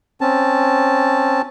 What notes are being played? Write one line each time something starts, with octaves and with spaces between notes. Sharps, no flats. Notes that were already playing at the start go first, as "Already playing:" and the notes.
C4 C#4 A5